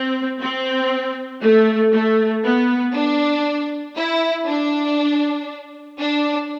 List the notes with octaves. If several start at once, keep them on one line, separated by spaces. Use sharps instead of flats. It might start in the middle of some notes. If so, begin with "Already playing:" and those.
Already playing: C4
C4
A3
A3
B3
D4
E4
D4
D4